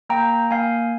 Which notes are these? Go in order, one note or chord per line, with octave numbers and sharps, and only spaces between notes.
A#3 G5 A#5
A#3 F5 G#5